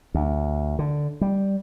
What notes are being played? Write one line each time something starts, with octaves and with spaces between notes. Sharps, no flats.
D2
D3
G3